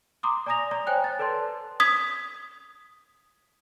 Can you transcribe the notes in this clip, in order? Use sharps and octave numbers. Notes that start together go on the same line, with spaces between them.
A#5 C6 D6 D#6
D5 G#5 A#5 D#6 A#6 F7
D5 A#5
C5 C#5 G5 G#5 F#6
A6
A4 B4 D5 A5 C6
D#6 G#6 B6